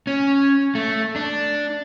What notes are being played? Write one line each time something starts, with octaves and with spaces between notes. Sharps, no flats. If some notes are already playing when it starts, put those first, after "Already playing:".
C#4
A3
D4